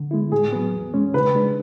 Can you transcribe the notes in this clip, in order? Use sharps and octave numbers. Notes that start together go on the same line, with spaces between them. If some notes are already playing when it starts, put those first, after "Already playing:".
Already playing: D3
G#3 B3 E4
A2 G#4
F#3 B3
E2
B2 G#3 C#4
C#3 B4
G#3 D4